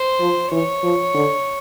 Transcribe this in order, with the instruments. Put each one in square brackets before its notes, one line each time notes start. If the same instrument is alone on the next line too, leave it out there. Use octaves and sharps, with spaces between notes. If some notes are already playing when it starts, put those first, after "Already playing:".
Already playing: [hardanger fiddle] C5
[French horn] F3
[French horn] E3 [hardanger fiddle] C#5
[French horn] F3
D3